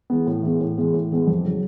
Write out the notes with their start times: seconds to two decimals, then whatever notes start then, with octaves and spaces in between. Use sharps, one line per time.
0.10 E3 G#3 B3
0.27 A2
0.43 E3 G#3 B3
0.60 A2
0.78 E3 G#3 B3
0.93 A2
1.11 E3 G#3 B3
1.27 F2
1.45 C#3 F#3